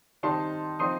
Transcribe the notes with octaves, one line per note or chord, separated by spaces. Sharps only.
D#3 G3 C4 D#4 A5 C6
F3 C4 D#4 C6 D#6